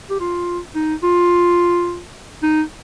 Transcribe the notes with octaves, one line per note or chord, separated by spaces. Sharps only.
G4
F4
D#4
F4
D#4